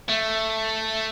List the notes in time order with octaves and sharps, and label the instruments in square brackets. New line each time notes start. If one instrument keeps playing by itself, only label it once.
[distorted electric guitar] A3